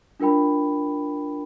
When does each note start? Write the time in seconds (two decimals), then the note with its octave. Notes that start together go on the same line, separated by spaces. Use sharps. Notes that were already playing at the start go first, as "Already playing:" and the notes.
0.20 D4 F4 A#4 G5 B5